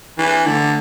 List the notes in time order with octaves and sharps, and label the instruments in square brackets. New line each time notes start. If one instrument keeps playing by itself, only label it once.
[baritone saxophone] E3 [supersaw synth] D4
[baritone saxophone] D3 [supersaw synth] A3